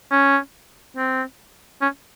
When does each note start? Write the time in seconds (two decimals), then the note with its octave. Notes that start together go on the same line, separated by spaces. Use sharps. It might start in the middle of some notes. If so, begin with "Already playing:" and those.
0.11 C#4
0.97 C4
1.81 C#4